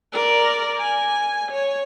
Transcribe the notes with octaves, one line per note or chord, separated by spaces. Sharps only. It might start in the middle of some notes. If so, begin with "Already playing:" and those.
A#4 D5
G#5
C#5